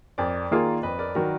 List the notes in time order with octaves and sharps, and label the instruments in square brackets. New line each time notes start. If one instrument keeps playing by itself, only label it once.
[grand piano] F2 [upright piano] A#4 D5
[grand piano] D#3 A#3 F4 G#4
[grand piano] F2 [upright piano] B4 D#5
[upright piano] A#4 D5
[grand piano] D#3 F#3 [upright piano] F#4 A#4